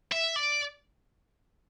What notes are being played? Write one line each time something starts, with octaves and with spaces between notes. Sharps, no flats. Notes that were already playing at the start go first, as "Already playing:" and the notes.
E5
D5